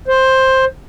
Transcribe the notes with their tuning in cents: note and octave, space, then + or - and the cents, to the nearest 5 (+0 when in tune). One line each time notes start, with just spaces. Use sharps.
C5 +10